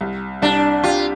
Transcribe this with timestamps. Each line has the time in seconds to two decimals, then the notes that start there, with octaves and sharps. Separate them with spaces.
0.01 C2
0.42 C2 D4
0.83 F4 G4